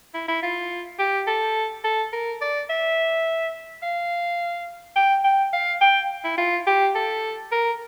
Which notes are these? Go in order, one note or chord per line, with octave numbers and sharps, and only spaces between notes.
E4
E4
F4
G4
A4
A4
A#4
D5
E5
F5
G5
G5
F5
G5
E4
F4
G4
A4
A#4